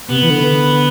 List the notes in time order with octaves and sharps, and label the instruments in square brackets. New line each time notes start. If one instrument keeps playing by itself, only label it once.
[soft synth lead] C3 [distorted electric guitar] B3
[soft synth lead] E3
D3